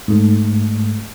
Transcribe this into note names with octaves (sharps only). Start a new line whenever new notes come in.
G#2 A3